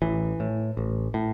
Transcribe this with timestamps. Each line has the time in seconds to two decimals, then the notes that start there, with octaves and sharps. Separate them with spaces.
0.02 A1 E3
0.40 A2
0.77 A1
1.14 A2